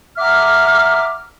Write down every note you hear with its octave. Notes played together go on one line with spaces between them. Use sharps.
E5 F#5 A#5 D6 F6